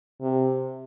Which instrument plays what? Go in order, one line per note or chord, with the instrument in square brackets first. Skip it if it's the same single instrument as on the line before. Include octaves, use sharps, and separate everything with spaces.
[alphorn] C3